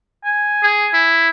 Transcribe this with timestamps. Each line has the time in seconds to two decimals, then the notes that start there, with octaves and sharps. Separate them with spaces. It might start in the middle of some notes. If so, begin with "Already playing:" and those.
0.24 G#5
0.63 G#4
0.94 E4